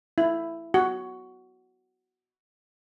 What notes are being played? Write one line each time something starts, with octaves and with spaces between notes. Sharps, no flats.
E4
F#4